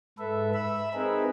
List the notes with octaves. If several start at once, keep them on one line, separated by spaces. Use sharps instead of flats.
G#2 A4 B4 E5
E5 B5 E6
C4 D#4 G#4 A#4 B4